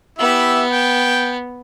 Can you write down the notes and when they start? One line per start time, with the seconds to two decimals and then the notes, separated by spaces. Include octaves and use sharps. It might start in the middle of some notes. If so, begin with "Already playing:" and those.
0.19 B3 E4 G4 E5
0.72 G5